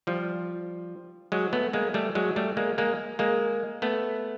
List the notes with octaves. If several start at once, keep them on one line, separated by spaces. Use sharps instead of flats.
F3 G3
F#3 G#3
A3 B3
G#3 A#3
G3 A3
F#3 G#3
G3 A3
G#3 A#3
G#3 A#3
G#3 A#3
A3 B3